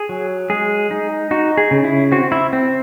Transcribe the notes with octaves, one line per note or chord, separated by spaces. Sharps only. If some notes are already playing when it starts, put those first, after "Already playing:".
Already playing: G#4
F#3
G#3 G#4
D#4
D#4 F#4
G#4
C#3
E4
C4 F#4
E4
C4